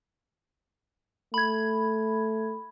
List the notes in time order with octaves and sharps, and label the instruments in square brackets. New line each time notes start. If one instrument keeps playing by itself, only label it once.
[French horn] A3 [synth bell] B5 G#6